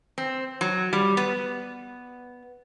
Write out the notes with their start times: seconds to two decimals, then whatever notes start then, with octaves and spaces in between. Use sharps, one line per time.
0.18 C4
0.61 F#3
0.93 G3
1.17 B3